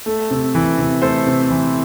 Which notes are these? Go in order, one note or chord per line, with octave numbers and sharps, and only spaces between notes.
A3
C3
E3
C3
A3 A4 C5
C3
E3